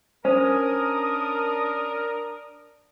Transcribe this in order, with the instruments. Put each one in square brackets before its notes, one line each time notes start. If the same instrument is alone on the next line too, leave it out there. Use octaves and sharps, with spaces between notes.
[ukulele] C#4 [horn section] D4 A#4 [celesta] C5 [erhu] D#6